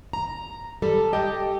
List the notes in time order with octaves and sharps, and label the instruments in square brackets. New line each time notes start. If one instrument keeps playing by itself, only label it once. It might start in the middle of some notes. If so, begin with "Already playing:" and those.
[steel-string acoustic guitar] A#5
[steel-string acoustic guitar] G3 [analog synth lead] A4
[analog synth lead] G4 [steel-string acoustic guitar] D#5